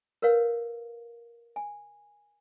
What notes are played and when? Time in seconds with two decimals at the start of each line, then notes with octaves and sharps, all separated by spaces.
0.22 A#4 B4 C#5 F5
1.56 G#5